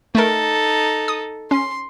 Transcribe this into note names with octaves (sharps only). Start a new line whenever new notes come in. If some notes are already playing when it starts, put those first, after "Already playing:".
A3 D#4 A4 A#4
D#6
C#4 C6